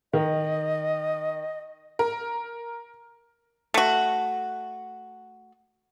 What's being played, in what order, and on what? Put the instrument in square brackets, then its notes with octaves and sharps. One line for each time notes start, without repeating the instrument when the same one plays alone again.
[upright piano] D#3 [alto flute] D#5
[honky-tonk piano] A#4
[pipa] A3 F#4